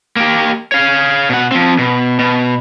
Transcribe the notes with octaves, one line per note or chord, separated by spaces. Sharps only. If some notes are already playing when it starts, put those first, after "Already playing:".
A#3 G4
C#5 F5
B2 F#5
F3 C4
B2
B2